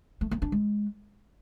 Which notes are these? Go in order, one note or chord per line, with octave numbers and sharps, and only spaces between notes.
A3
A#3
D4
G#3